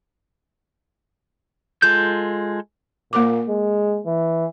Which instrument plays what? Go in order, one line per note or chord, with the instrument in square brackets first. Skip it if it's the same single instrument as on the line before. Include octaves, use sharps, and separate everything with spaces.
[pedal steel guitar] G#3 F4 A4 G6
[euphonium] A#2 [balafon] A#3 A#4 D6
[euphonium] G#3
E3